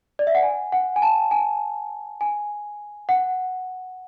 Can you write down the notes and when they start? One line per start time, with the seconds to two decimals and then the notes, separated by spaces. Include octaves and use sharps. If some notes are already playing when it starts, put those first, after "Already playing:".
0.19 D5
0.27 E5
0.35 F#5
0.43 G#5
0.72 F#5
0.96 G#5
1.02 A5
1.31 G#5
2.21 G#5
3.09 F#5